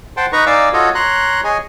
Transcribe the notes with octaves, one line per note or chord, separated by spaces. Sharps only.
C5 F#5 G5 A5 C6
D#4 B4 A#5 C#6
D#4 D5 F5 G#5 D6 E6
F4 F#4 A4 C#5 D#5
C#5 A#5 C6 F#6
G#4 C#5 D#5 G#5